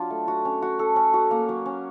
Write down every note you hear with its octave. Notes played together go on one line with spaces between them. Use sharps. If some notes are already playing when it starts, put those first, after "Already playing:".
Already playing: F#3 D4 F4
A3
F#4
C#4
F#4
A4
C#4
F#4
A#3
F#3
C#4